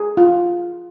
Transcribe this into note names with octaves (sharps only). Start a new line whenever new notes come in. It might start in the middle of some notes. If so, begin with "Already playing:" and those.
Already playing: G#4
F4